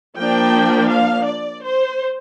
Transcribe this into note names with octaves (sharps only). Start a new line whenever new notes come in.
F3 A#3 D4 G5
F5
D5
C5